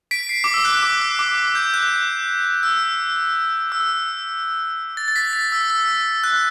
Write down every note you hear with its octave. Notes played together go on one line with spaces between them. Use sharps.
B6 D7
C7
D6
E6
F#6
D6
E6
D6
G6
F#6
E6
E6
A6
A6
B6
A6
E6
E6
F#6